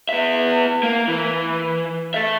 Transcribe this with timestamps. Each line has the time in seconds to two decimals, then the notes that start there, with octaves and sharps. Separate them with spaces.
0.09 B3 E5
0.83 A#3
1.08 E3
2.14 A4 E5